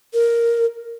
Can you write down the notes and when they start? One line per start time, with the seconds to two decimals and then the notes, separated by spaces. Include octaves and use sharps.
0.14 A#4